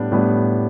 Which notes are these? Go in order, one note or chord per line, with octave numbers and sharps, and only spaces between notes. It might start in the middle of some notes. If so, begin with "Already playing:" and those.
Already playing: A2 G3 B3 D4
A2 G3 B3 D4